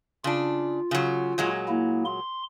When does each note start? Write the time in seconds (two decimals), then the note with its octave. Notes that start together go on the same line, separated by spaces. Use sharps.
0.24 C#3 D4 F4
0.91 C#3 F#3
1.38 A#2 F#3 G#3
1.68 A#3 E4
2.05 C6